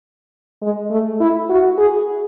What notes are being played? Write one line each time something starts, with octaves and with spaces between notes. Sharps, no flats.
G#3
A3
E4
F#4
G#4